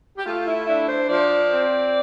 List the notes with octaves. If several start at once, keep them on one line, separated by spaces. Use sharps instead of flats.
G4
A3 F4
E4
D4 E4
C5
F3 D5
C4